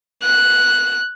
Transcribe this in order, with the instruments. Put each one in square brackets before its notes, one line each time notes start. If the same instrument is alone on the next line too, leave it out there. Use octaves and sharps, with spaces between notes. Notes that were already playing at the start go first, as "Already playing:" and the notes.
[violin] F#6